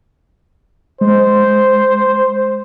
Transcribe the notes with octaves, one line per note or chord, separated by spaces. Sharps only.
G#3 C5